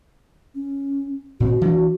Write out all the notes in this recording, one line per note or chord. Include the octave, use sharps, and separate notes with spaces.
C#4
A#2 C4 F#4
E3 D4